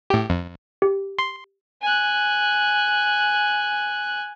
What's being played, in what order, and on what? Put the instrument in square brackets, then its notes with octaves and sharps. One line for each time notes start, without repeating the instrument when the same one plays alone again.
[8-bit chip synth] A2 G4
F2
[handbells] G4
[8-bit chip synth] C6
[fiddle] G#5 F#6